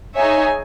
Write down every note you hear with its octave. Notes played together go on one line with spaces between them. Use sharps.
D#4 G#4 C#5 E5 G#5